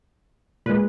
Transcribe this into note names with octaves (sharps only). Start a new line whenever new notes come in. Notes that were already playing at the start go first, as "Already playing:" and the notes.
A#2 G#3 B4